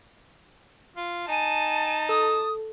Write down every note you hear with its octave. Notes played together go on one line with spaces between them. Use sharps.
F4
D#4 G#5 A5
A4 D#6